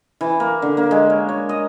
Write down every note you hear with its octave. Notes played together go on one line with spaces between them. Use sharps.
E3
A#3
D3
A#3
G#3
C#5
C#5
D#5